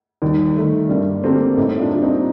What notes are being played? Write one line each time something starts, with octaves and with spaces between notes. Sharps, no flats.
D#2 D#3 G3
D#3 A3
G2 G3 A#3
D3 G3 A3 A#3 C4 D4
A2 C4 D#4
D4 F4
G3 A#3 D4
C4 D#4